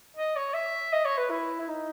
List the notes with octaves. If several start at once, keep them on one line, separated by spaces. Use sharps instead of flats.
D#5
C#5
E5
D#5
C#5
B4
E4
E4
D#4